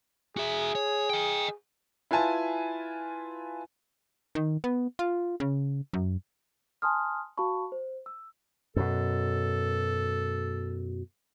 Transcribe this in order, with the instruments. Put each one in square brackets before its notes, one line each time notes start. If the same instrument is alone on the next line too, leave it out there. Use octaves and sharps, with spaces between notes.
[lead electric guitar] F#4 E5 [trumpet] G#4
[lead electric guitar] C#5
D#5 G5
[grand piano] E4 F4 B4 G#5 A5
[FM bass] D#3
B3
F4
C#3
F#2
[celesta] G#5 A5 C6 D#6 F6
F#4 F5 A5 B5 C#6
C5
E6
[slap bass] F#2 B2 [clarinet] A4